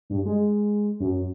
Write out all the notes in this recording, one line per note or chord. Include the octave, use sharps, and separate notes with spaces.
G2
G#3
F#2